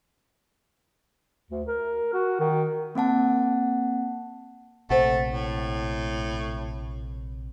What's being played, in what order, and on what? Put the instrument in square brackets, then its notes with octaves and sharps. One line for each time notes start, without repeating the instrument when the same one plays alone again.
[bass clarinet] D2
A#4
F#4
D#3
[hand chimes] A#3 C4 F#5 A5
[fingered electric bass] A#1 C3 [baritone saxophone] A3 [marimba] C5 F#5
[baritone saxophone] A2